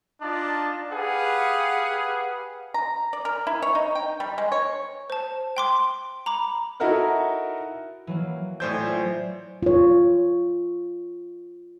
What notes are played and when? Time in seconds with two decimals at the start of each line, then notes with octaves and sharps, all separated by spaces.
0.21 D4 D#4 F4 D5 D#5 A5
0.91 G4 G#4 B4 F5 F#5
2.74 A#5
3.13 D5
3.25 A#4
3.47 E4
3.62 C#5
3.75 D#4
3.95 G5
4.20 G3
4.38 G#3
4.52 C#5
5.10 C5 A5
5.57 G5 C6 D6
6.26 A#5 B5 D6
6.80 D#4 E4 F#4 A4 A#4 D#5
8.07 E3 F#3 A#3
8.60 A2 C5 D5 E5 G#5 G6
8.80 F4
9.63 F4 C#5